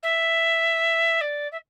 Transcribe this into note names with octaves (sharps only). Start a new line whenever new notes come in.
E5
D5
E5